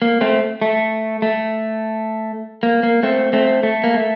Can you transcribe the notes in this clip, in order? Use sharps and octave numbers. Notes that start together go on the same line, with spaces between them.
A#3
A3 C4
A3
A3
A#3
A#3
A3 C4
A3 C4
A3
A#3
A3